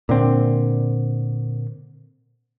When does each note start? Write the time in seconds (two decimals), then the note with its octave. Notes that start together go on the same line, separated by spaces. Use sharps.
0.09 A#2 D3 C4